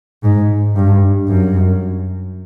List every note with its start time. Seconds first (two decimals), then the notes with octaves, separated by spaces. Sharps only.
0.23 G#2
0.75 G2
1.28 F#2